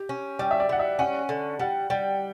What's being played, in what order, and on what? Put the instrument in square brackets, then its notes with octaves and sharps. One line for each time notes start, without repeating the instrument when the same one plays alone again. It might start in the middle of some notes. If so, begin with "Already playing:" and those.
Already playing: [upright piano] G4
[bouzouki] C#4
[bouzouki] G3 [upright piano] D5
[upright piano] E5
D5
[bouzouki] G3 [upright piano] F#5
[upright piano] E5
[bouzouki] C#4 [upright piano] F#5
[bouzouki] D3
[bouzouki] G3 [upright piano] F#5
[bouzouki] G3 [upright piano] G5